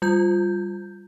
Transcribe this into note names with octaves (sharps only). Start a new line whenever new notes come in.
G3 F4 G6